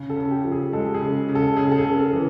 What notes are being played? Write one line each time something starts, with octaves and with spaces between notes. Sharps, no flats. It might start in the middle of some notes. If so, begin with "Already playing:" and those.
Already playing: C#3
A4
C#3
G4
F3
G#4
G#3 A4
G#4
C#3
C#3
A4
C#3 G#4
A4
G#4
C#3 A#4
A4
E3